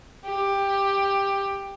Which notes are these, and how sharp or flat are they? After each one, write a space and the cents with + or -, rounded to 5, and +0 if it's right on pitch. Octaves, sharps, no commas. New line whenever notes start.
G4 +10